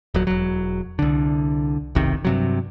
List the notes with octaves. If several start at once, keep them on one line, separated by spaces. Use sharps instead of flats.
D#1 F#3
E1 F#3
C2 D3
F1 B1 C3 D#3
G2 C3 F#3